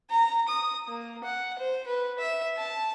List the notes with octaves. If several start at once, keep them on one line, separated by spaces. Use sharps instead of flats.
A#5
D#6
A#3
F#5
C5
B4
E5
A5